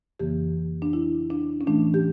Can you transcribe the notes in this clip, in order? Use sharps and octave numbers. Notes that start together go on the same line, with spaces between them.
F2 C#3 E3 A#3 G4
D4
E4
D4
C#4
A2 E3 A3 D4
G4